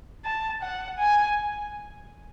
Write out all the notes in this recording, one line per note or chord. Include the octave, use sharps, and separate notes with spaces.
A5
F#5
G#5